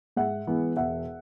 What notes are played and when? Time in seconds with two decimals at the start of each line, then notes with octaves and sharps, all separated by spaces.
0.16 G#2 E5 F#5
0.47 E3 G#3 B3
0.77 E1 E5 F#5